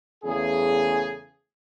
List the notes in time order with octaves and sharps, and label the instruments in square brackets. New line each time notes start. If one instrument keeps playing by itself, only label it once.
[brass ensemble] E2 C#3 A3 G#4